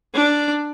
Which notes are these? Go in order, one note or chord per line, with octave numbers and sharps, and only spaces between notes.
D4